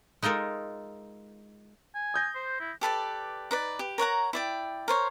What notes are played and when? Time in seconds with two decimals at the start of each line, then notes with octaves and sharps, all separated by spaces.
0.22 G#3 D#4 F4 A4 A#4
1.95 G#5
2.14 D#6 G6 A#6
2.35 C5
2.60 E4
2.81 G4 A4 B4 D5
3.51 D#4 B4 D5
3.79 G4
3.98 A#4 C#5 F#5 A#5
4.33 E4 D5 G5
4.88 A#4 C5 C#5